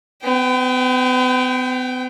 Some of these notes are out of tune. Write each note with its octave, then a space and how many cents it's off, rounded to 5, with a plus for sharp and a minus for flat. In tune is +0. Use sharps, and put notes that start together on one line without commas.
B3 +40 G5 +0